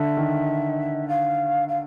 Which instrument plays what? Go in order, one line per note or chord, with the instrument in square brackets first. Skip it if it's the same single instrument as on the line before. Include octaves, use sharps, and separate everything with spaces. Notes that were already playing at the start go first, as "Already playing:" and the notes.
Already playing: [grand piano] D3 [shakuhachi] E5
[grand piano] D#3
[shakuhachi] F5
F5